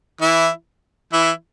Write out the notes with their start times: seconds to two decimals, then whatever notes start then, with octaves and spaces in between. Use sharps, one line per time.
0.21 E3 E4
1.13 E3 E4